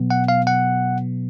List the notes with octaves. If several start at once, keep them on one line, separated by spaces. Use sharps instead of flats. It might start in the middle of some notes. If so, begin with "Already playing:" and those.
Already playing: B2 F#3 B3
F#5
F5
F#5